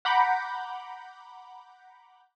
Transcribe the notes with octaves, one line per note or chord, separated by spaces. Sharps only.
F#5 A#5 B5 D6 G6